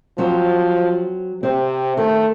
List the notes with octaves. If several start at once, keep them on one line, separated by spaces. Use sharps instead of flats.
F3 F#3 C4
C3 C4
D#3 A3